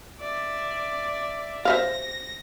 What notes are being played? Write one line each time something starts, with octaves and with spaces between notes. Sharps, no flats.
D5 E5
C5 E5 F5 A#6